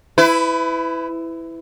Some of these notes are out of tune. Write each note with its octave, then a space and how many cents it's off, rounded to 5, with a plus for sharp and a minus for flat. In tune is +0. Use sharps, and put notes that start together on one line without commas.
E4 +0 B4 +30